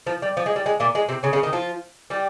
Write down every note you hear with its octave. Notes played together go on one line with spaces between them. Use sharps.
F3
G3
F3
G#3
G3
G#3
A#2 A#3
G#3
C3 C4
C#3 C#4
C#3 C#4
D#3 D#4
F3 F4
G3 G4